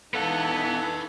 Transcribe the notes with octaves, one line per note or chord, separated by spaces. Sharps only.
E3 B3 D#4 A4 B4 F5 F#5